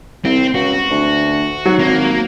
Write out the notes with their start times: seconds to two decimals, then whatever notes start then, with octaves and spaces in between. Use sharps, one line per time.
0.25 C2 C4
0.54 C#2 F#4
0.90 D2
1.65 G#2 F#3
1.79 G#1 A#3